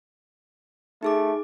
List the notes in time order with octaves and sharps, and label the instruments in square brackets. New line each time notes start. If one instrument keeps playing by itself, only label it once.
[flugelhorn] A3 [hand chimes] D#4 G#4 D6